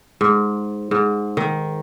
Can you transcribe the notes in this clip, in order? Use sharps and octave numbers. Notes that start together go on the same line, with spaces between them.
G#2
G#2
D#3